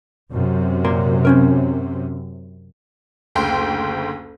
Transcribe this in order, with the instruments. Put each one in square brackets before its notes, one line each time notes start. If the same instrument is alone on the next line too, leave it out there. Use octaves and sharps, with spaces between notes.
[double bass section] F#2 C3
[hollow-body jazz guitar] A#2 A#4 C6
C4 C#4 A#4
[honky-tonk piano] F#1 D2 G5 C6